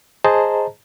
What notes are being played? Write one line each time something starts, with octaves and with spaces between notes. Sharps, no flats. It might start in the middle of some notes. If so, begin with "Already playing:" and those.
G#4 C5 D#5 A5 A#5